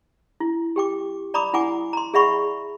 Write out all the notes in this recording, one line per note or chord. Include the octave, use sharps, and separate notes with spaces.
E4
G4 G5 D6
D5 A#5 B5 D6 D#6
E4 F#5 G#5 D6
A#5 C6
G#4 D5 E5 F#5 B5 C#6